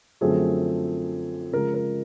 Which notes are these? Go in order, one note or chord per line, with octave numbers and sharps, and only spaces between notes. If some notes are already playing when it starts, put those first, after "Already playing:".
F#2 D3 F3 A3 C4 G#4
C#3 F3 G#3 A#4
A#4